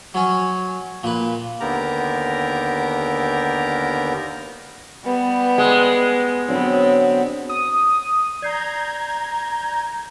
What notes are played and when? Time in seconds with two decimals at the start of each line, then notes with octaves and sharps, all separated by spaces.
0.14 F#3 C#4
1.03 A#2 B4
1.60 D#2 D3 B3 G4 A#4 A#5
5.05 G3 B3
5.58 G#3 D6
6.48 D3 F#3 B3 C4
7.49 D#6
8.42 D5 A#5 G6 G#6 C7